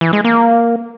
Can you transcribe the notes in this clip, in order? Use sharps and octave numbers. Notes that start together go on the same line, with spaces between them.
E3
G#3
A#3